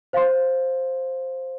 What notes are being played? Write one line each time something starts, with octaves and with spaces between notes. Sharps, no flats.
C5 F5 C6